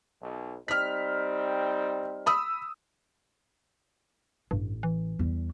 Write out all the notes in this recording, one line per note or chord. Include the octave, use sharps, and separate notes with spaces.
B1
G3 C4 D#4 F6 B6
B5 D#6 E6
A1 G2
E3
E2 G3